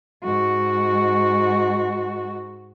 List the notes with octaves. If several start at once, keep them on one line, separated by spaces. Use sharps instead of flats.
G#2 F#4